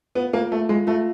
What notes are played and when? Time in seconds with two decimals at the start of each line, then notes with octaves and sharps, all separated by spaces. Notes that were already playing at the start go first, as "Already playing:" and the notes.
0.15 B3 F4
0.33 A#3 F4
0.52 A3 F4
0.69 G#3 F4
0.87 A3 F4